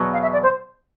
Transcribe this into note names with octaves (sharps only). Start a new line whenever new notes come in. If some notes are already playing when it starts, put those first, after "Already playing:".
Already playing: E2 B2 F#3
F5
E5
D5
C5